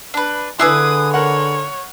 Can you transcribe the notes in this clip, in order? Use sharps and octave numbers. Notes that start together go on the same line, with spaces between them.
D4 B4
D3 D4 E4 G#4 B4 D#6 E6
A#4 C#5 F#5